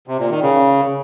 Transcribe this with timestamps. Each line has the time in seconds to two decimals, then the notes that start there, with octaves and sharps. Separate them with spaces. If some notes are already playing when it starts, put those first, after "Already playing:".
0.07 C3
0.19 A#2
0.31 D#3
0.42 C#3